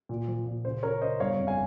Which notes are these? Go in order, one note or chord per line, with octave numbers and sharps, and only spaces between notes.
A#2
F3
A#2
C#3 C5
C#3 A#4 C#5
C#3 C5 D#5
G1 C#5 F5
F2
F5 G#5